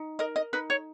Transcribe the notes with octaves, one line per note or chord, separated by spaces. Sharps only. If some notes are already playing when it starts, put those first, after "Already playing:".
Already playing: D#4
A#4 D#5
D#5
D#4 B4
C#5